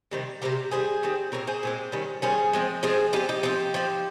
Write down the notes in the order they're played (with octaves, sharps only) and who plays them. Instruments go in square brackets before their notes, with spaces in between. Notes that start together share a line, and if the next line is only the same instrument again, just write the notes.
[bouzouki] C3 D#3 G3 C4
C3 D#3 G3 C4 G4 A#4
D#3 G3 C4 G#4 C5
D#3 G3 C4
A#2 G#3 C4 A#4 C#5
G#4 C5
A#2 G#3 C4
D#3 G3 C#4
D#3 G3 C#4 G#4 C5
F3 G#3 C4
F3 G#3 C4 G#4 C5
F3 D#4 G4
C4
D#4 G4
F3 C4 D#4 G4
F3 C4